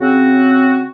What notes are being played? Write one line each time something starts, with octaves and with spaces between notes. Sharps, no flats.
C#3 C4 F#4